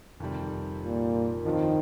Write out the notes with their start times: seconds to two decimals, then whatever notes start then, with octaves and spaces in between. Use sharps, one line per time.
0.20 F2 C3 D#3 G3
0.83 A#2
1.45 G2 D#3 F3 C4 F4